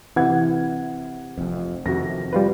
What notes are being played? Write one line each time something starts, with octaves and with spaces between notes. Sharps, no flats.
C3 E3 F#5 G#6
F1 F2
F2 C3 D#3 F#4 A#6
G3 F4 B4